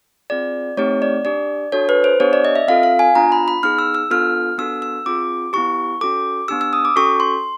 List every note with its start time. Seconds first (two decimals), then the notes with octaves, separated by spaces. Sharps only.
0.30 C4 F4 G#4 D5
0.77 A3 C4 D#4 G4 C#5
1.02 D5
1.25 D4 G4 D5
1.72 D4 F#4 A4 C#5
1.89 B4
2.04 C5
2.20 B3 D4 G4 C#5
2.33 D5
2.45 D#5
2.56 E5
2.68 C4 F4 A4 F5
2.83 F5
2.99 G#5
3.15 B3 D4 F4 A#5
3.32 B5
3.48 B5
3.63 B3 D#4 G#4 F6
3.78 E6
3.95 E6
4.10 B3 D4 F4 A4 F6
4.58 B3 D4 F#4 A4 E6
4.82 E6
5.06 C4 F4 G#4 D6
5.53 B3 E4 G4 C#6
6.01 C#4 F#4 A4 D6
6.48 B3 D4 G4 E6
6.61 E6
6.73 D#6
6.85 D6
6.96 C#4 F#4 A4 C#6
7.20 C6